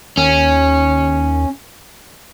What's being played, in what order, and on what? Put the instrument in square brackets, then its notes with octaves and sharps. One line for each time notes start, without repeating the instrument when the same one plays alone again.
[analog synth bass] D#2 [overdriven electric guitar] C#4